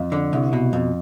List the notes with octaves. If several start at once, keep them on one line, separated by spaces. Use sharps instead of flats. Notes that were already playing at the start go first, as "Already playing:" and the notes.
Already playing: F2
D3
C2
B2
F2